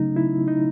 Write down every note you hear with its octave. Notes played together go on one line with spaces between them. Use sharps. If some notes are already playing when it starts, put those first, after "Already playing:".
Already playing: C#3 F#3 A3 C#4 D#4
E4
D#4